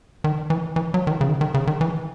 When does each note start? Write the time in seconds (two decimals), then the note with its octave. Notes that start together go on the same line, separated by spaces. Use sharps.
0.24 D#3
0.50 E3
0.76 E3
0.94 F#3
1.07 D#3
1.11 E3
1.21 C#3
1.29 D#3
1.41 D#3
1.54 C#3
1.67 D#3
1.81 E3